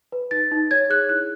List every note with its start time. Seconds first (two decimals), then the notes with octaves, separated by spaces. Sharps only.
0.12 B4
0.31 D#4 A6
0.52 D#4
0.71 C#5 G#6
0.89 G#4 F#6
1.09 E4 F#6